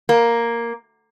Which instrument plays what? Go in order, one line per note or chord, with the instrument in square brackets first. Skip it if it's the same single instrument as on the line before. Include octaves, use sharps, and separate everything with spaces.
[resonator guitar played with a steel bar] A#3